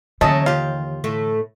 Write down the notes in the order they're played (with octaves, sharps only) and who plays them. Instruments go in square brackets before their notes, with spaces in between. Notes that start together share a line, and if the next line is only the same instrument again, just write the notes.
[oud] D#2 F#3 C#4 [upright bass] D3 E3 [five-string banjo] A3 [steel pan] D#5 A5
[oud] D#2 G4 [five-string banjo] F4
[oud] A2 A3